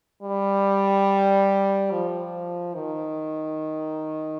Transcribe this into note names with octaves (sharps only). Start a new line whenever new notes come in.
G3
F3
D#3